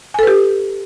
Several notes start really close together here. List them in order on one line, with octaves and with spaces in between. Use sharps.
G#5 A4 B4 G4